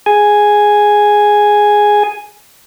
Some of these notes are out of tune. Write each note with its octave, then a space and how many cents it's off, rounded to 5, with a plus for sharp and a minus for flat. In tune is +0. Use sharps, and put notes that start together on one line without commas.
G#4 +0 G#5 +0